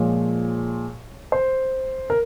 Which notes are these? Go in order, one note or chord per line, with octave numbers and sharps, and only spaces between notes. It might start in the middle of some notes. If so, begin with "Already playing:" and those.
Already playing: A#2 F3 G#3 C#5
C5
A#4